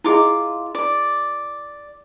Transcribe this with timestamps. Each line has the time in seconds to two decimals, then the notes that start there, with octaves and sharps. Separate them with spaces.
0.04 E4 F4 G#4 D#5 D6
0.75 D5